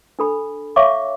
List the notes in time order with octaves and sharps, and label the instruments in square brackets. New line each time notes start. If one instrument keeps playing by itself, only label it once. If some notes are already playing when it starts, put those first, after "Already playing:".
[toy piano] D4 A4 B5
C#5 E5 F5 C#6 D6